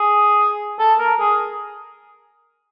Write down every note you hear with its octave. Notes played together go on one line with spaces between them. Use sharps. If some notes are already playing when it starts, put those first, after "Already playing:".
Already playing: G#4
A4
A#4
G#4